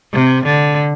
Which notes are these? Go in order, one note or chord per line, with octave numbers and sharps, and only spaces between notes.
C3
D3